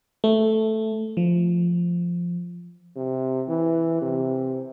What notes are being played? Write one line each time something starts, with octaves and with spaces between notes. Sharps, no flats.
A3
F3
C3
E3
C3